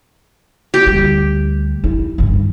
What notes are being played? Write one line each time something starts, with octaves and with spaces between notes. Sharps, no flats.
G4
D2 G3
E4
G2 D#3